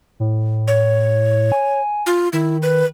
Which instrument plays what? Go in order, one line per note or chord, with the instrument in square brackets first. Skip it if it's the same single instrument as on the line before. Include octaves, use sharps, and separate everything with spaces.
[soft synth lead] A2
[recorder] C#5
[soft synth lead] G#5
[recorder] F4
[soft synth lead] D#3 [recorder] E4
[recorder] B4